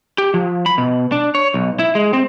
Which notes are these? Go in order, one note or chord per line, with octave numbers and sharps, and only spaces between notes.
G4
F3
B5
B2
D4
C#5
B1
E4
G#3
C4